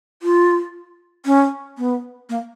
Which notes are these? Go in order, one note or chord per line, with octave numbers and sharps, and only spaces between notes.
F4
C#4
B3
A#3